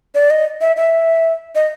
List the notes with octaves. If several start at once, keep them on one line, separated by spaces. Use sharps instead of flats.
D5
D#5
E5
E5
D#5